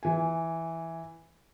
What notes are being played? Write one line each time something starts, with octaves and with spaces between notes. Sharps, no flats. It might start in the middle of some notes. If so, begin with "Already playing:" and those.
E3 G#5